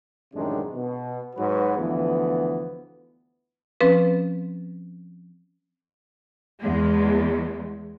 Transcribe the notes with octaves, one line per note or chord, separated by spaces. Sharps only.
A1 F#2 C3 D#3 G#3 D4
B2
G#2 F#3 F#4 B4
D2 E3 F3 B3
F3 C4 C#4 B4
E2 G#3